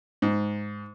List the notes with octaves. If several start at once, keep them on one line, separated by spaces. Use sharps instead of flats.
G#2